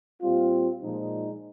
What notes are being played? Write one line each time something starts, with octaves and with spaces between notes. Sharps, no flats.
A#2 G3 C4 F4
A#2 F3 G#3 D#4